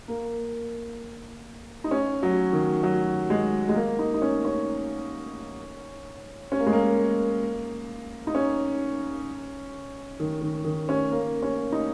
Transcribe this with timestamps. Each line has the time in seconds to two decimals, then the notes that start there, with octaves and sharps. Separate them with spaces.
0.08 A#3
1.84 D#4
1.91 C#4
2.23 F#3
2.53 D#3
2.83 F#3
3.30 G#3
3.69 G#3
3.75 A#3
3.99 D#4
4.14 D#4
4.22 C#4
4.45 C#4
6.52 C#4
6.59 A#3
6.66 G#3
6.73 A#3
8.27 D#4
8.35 C#4
10.20 D#3
10.42 D#3
10.65 D#3
10.89 C#4
11.12 A#3
11.42 C#4
11.72 D#4